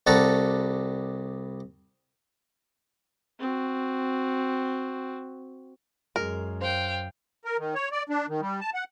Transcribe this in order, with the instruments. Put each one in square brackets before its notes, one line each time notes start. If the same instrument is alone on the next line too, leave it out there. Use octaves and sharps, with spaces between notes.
[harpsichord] C2 G3 A4 F#5 A#5 C#6
[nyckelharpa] C4 F#4
[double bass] F#2 [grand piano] G#3 [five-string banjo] A#4
[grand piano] C5 [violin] F5 G5
[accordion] A#4
D#3
C#5
D5
D4
D#3
G3
A5
F#5